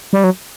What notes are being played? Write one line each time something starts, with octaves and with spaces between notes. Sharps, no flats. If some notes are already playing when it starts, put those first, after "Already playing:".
G3
F#3